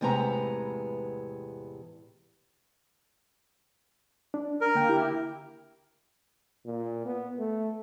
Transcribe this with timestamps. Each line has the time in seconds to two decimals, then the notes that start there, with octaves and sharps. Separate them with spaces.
0.01 E2 A2 C3 G#3 B3 A#5
4.34 D4
4.61 A#4
4.75 D3 A#3 G5
4.88 E4 G4
6.66 A#2
7.05 B3
7.39 A3